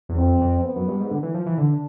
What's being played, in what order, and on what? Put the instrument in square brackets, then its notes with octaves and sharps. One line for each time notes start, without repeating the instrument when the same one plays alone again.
[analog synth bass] E2
[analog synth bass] F2 [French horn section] C4
[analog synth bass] F2
[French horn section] B3
[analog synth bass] F#2
G2
G#2
D3
E3
F3
E3
[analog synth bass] D3 [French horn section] D4